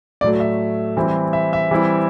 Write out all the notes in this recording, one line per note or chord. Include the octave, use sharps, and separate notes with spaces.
A2 F#3 A3 D5
E5
E3 G3 C4 E4
E5
E5
E3 G3 C4 E4